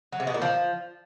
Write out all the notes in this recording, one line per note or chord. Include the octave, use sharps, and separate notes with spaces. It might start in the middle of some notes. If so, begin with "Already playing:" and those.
F#3
C3
B2
A#2
F3